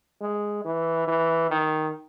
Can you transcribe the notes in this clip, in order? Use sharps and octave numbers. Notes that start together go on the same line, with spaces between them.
G#3
E3
E3
D#3